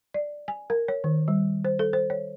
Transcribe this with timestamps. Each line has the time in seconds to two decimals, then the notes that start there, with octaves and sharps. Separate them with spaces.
0.14 D5
0.48 G#5
0.70 A#4
0.88 C#5
1.04 D#3
1.28 G3
1.65 C5
1.79 A4
1.93 C5
2.10 C#5